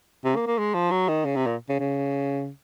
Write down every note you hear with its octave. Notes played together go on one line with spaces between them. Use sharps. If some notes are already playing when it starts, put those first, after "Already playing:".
C3
A#3
A#3
G#3
F3
F#3
D#3
C#3
C3
A#2
C#3
C#3